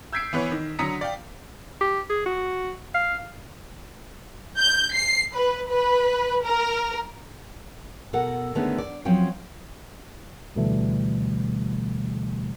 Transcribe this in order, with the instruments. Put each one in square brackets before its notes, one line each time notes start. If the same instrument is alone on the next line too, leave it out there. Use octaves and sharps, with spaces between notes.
[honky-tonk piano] E6 G6 G#6 B6 C7 D7
E3 B3 B4 C#5
D#3
D3 F#3 A#5 D#6 B6 C#7
D5 F5 G5
[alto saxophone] G4
G#4
F#4
F5
[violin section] G6
C7
B4
B4
A#4
[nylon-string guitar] B2 A4 A#4 F#5
D3 D#3 G#3 A3 B3 C#4
D5
F3 F#3 C4 C#4 G5
[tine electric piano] D2 B2 D3 E3 G3 A3